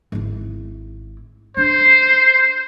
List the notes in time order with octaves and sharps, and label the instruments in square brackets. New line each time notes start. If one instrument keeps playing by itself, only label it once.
[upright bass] G#1 E4
[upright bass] D4 [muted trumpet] C5